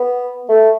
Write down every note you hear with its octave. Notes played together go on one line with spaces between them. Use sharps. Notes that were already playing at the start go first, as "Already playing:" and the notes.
Already playing: B3
A3